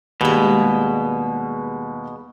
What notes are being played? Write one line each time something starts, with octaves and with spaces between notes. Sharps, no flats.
D#2 B2 G3 G#3